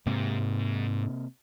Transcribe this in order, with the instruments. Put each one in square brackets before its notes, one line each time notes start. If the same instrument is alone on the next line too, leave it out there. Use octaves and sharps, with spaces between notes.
[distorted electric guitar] G#2 [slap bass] C3 A#3